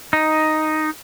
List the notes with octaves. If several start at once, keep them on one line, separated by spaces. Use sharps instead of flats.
D#4